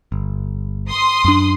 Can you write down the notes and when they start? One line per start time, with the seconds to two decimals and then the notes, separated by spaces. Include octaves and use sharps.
0.12 G1
0.89 C6 D#6
1.25 F#2 D4